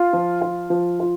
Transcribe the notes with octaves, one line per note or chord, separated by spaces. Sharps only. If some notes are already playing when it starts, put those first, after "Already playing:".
Already playing: F4
F3
F4
F3
F4